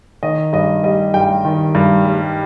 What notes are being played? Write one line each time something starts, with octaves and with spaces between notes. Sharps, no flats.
D#3 D#5
G2 D#5
G3 D#5
G2 G5
D#3
G2
G3